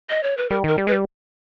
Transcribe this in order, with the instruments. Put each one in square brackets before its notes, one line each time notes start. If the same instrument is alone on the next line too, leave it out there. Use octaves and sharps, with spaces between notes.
[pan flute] D#5
C#5
B4
[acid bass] G3 [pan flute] A#4
[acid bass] D#3 [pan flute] A#4
[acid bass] G3
[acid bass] G#3 [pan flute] B4
[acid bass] G3